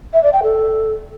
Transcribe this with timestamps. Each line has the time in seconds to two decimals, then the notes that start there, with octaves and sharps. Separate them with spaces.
0.13 E5
0.23 D5
0.33 G5
0.42 A4